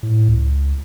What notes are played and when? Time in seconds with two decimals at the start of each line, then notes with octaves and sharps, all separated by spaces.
0.03 A2
0.28 C#2